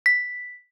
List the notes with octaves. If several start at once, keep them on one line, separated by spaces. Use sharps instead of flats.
B6